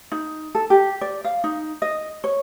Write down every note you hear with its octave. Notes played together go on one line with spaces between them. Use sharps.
D#4
A4
G4
D5
F5
D#4
D#5
C#5